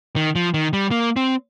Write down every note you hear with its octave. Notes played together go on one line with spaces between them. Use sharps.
D#3
F3
D#3
G3
A#3
C4